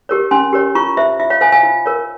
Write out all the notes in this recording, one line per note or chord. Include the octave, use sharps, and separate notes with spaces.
G4 A#4 C#5
C#4 G#5 C6
G4 A#4 C#5
F4 A#5 C#6
C5 E5
F4 E5
C#5 F5
C5 F5 G#5
F5 G#5
F4
A#4 C#5